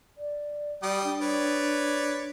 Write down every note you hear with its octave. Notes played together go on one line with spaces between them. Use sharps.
D5
G3 D5 G5 D#6
D4
B4 C#5 D5